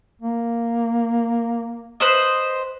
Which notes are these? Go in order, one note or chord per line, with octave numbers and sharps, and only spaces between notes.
A#3
B4 C5 D#5